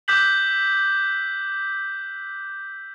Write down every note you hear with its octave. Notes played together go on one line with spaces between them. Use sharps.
D6 E6 F#6 G6 B6 F#7